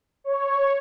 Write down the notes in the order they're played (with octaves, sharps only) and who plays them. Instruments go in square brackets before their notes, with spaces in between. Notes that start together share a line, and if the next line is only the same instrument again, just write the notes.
[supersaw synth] C#5